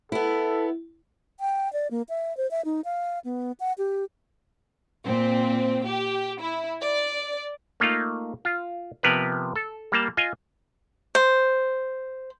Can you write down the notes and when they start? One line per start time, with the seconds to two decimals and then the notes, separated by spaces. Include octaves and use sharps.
0.12 B3 E4 A4
1.40 G5
1.73 D5
1.91 A#3
2.09 E5
2.37 C5
2.51 E5
2.65 D#4
2.85 F5
3.25 B3
3.60 F#5
3.78 G4
5.05 A#2 C4
5.86 G4
6.40 E4
6.81 D5
7.80 A3 A#3 D#4 F4
8.45 F4
9.03 C3 F3 B3 A#4 B4
9.56 A4
9.92 G3 A#3 A5
10.17 F4 D#5 G#5
11.15 C5